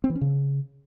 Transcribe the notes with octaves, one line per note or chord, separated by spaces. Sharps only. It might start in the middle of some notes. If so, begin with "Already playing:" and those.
C4
E3
C#4
C#3